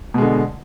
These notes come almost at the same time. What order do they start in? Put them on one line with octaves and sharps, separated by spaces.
B2 G#3 D3